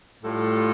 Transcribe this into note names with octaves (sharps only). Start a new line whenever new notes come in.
A2 G3 F4 A4